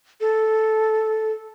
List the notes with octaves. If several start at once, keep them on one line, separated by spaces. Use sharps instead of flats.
A4